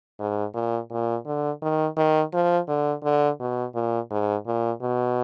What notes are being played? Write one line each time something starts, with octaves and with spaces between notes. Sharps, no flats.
G#2
A#2
A#2
D3
D#3
D#3
F3
D3
D3
B2
A#2
G#2
A#2
B2